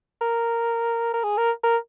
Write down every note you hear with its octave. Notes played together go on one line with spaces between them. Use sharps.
A#4
A#4
G#4
A#4
A#4